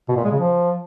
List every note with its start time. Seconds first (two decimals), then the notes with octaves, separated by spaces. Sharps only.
0.09 B2
0.16 A#2
0.24 G#3
0.32 C#3
0.39 F3